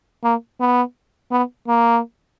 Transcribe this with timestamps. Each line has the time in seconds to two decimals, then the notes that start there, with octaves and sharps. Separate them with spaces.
0.24 A#3
0.60 B3
1.31 B3
1.68 A#3